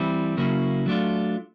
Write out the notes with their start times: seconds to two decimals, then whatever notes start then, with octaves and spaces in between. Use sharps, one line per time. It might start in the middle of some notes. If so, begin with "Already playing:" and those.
Already playing: E3 G3 C4 E4
0.37 C#3 F#3 A#3 C#4 E4
0.86 F#3 A3 D4 F4